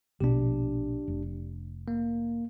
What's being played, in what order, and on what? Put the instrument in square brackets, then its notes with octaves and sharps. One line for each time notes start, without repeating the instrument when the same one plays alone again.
[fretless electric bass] A#1 B2 B3 [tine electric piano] D4 G4
[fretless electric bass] F1
[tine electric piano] A#3